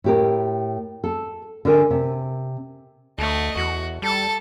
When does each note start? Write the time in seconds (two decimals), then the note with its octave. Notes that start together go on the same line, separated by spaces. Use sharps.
0.04 A2 G4 A#4
1.04 A4
1.65 D3 A#4 G#5
1.90 C3
3.18 D2 A3 D#5
3.56 E2 F#4
4.02 G3 A4 A5